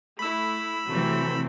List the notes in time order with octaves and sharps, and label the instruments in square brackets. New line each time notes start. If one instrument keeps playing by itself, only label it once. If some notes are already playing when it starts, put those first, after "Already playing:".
[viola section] A3 E4 [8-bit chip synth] B5 E6
[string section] C3 E3 [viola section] F#3 A3 C4